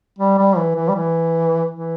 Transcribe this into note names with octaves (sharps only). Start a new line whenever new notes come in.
G3
G3
E3
E3
G3
E3
E3